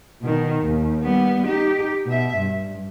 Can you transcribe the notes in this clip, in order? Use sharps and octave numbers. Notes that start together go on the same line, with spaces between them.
B2 D#3
D#2
G3 B3
D#4 G4
B2 E5
G2